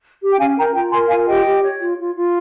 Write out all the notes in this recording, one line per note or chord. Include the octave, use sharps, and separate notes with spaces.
G4
G5
C#4 F5 G#5
A#4 G5 A#5
F4 G5 A#5
A#4 G#5 C6
F4 F5 G#5
G4 D#5 G5
G4
C#5
F4
F4
F4